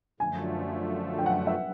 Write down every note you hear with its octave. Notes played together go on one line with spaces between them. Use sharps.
F#2 D3 F3 A3 G#5
G5
F#5
E5